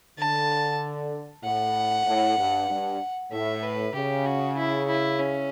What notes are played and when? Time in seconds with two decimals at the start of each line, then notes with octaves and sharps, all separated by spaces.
0.18 D3 A5
1.44 A2 F#5
2.06 A2
2.38 G2
2.70 G2
3.31 A2 E5
3.63 B4
3.94 C#3 G4
4.26 F#4
4.57 E4
4.88 E4
5.19 C#4